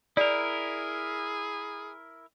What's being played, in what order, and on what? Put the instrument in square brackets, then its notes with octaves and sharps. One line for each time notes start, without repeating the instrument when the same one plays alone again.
[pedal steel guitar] E4 A#4 [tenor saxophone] G#4 [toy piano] D5